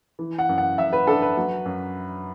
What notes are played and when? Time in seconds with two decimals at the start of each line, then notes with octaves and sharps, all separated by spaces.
0.19 E3
0.38 F#5
0.49 F#2
0.58 F#5
0.78 F#2 E5
0.93 B4
1.07 D4 A4
1.22 B4
1.37 F#3
1.65 F#2